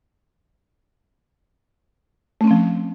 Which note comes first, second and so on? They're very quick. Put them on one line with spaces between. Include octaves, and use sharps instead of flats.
A3 C#4 C4 F3